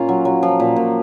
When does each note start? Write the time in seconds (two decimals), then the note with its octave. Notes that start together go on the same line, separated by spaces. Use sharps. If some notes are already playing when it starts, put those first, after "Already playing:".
Already playing: A#2 A#3 C#4 F4
0.09 F#3
0.25 F#3
0.43 F3
0.60 A#2
0.76 A#2